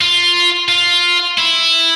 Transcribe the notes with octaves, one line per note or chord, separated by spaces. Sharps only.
F4
F4
E4